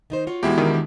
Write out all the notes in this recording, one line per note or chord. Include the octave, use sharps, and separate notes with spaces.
D#3 D#4 C5
F4 F#4 C#5
E2 B2 G#3 E4 G4
D#3 D4